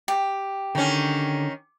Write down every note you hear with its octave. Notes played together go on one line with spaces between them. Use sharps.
G4
D3 D#3 C#4